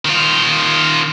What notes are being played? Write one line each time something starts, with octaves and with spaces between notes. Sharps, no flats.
D#3 F4